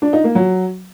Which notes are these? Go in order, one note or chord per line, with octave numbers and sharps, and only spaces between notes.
D4
D#4
A#3
F#3